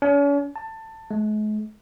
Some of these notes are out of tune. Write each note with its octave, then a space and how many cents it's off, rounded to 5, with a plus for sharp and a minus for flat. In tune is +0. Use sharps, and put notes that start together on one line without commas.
C#4 +40
A5 +15
G#3 +45